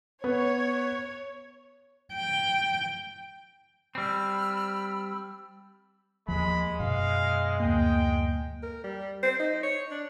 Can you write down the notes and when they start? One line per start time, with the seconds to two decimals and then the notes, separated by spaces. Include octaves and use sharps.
0.24 B3 C#5
2.14 G5
3.95 G3 C4 B5 E6 F6
6.28 D#2 F3 G#3 B5
6.80 F#2 B2 F5
7.60 D2 A#3 G5
8.63 A#4
8.84 G3
9.23 C5
9.39 D#4
9.63 C#5
9.91 D4